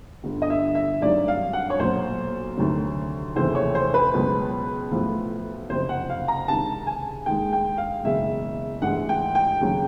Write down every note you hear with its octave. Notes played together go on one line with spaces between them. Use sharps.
G1 G2 D3
D#5
E5
E5
G#1 G2 D#3 F#3 D5
F5
F#5
C#5
B1 A#2 F#3 C5
D2 C3 D#3 F#3
F1 D#2 C#3 E3 C5
C#5
C5
B4
C#2 B2 F#3
B1 A2 F3
F#1 F2 C3 C5
F#5
F5
A#5
C#2 C3 D#3 A5
G#5
D#2 D#3 G#3 G5
G5
F5
F#1 E2 B2 G#3 E5
A1 G#2 E3 G#3 F#5
G5
G5
D#2 C#3 F#3